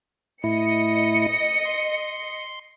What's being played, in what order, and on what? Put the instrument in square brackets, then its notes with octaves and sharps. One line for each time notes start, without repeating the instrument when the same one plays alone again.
[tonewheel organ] A2 E4 [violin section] D#5 C#7
[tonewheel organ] C6